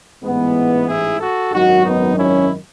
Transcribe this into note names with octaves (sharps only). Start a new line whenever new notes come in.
A1 G#2 E3 G#3 B3
E4 G#4
F#4 A4
G#1 F#2 D#3 F#3 D#4 F#4
B3 D#4
C#4 E4